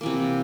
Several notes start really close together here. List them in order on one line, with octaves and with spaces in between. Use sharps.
A#3 E3 C3